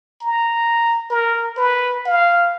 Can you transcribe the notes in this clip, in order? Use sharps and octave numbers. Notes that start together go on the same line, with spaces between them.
A#5
A#4
B4
F5